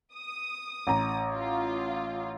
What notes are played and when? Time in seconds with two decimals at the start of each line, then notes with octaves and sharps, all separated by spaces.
0.14 D#6
0.87 A1 A#5
1.34 F4